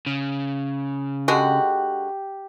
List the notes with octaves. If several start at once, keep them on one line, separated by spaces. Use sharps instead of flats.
C#3
D3 G#3 F#4 G4